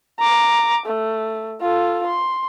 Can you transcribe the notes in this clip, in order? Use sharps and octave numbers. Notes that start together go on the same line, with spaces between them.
A#5 D6
A3
F4 A4
C6